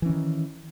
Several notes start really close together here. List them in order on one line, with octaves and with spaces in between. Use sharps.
E3 C#4 D#3